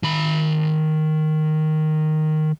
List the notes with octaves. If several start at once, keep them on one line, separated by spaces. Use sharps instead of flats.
D#3 B5